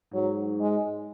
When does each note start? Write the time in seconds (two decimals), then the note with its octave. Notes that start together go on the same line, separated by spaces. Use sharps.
0.13 G#2 F#3
0.60 G#3